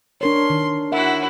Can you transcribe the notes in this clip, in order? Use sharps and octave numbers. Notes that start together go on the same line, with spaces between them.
D4 A#4 C#5 C6
D#3
E4 F#4 A#4 E5 F#5